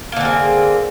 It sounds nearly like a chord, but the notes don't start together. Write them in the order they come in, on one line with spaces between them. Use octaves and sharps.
A#3 D3 C4 G#4